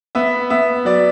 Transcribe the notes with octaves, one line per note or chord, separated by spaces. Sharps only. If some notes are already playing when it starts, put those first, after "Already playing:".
B3 E5
B3 E5
F#3 D5